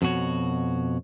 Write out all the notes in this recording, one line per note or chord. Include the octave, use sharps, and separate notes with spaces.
F2 B2 F#4 C#5